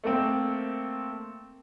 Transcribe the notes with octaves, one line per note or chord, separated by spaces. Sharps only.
A3 A#3 C4